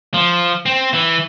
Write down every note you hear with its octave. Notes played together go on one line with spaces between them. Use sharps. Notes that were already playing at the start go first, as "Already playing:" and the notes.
F3
C4
E3